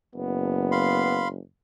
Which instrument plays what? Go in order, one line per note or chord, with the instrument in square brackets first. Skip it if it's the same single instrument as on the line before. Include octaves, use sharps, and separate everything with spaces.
[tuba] F#1 [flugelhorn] B3
[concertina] F5 B5 C6